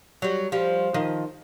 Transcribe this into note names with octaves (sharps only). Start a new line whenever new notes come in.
F#3 G3
F3 G3
D#3 F3 D#5